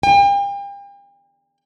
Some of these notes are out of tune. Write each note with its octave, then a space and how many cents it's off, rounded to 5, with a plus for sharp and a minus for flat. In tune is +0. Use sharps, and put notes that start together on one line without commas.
G5 +40